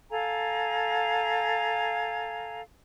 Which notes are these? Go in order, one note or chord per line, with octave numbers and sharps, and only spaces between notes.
A4 F5 G#5 A#5